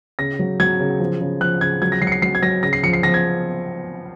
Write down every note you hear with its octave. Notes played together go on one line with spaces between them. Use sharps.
C#3 A#6
F#3
F#3 G#6
C#3
F3
C#3
F3 F#6
C#3 G#6
F#3 G#6
A#6
F#3 C7
C#7
C7
F#3 C7
G#6
F#3 A#6
C#3 A#6
C7
F3 C#7
C7
F3 A#6
G#6